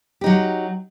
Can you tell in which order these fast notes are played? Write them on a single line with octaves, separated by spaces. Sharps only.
G4 D#4 F#3